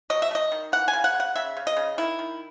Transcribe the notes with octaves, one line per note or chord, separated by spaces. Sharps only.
F#3 D#5
E5
A3
D#5
D#3
E3 F#5
G#5
C#3
F#5
C#3
F#5
C#3 E5
C#3
D#5
C#3
D#3 E4
D#3